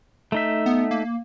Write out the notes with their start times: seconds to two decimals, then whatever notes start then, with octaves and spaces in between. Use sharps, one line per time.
0.32 A3 D#4 E5
0.66 B3
0.91 A#3